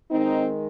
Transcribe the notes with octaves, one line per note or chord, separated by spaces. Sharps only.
D#3 G#3 C4 D#4